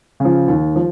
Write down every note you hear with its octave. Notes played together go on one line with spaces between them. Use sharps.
C#3 F3
D#2
F3